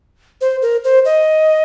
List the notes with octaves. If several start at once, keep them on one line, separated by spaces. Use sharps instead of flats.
C5
A#4
C5
D#5